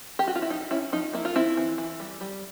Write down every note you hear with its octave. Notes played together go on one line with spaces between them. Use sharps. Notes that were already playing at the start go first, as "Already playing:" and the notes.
G4
F#4
F4
E4
F3 D#4
C#4 E4
F3 D#4
A#3 E4
F4
C4 E4
E3
E3
G3
G3